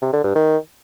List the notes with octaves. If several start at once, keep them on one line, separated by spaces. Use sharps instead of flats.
C3
D3
G2
D#3